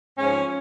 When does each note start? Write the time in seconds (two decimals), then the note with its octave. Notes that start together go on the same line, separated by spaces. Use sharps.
0.17 G#2 F3 C#4